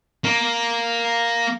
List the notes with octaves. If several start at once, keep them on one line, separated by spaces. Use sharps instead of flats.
A#3